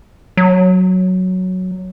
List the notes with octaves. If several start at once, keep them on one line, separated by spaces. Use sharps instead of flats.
F#3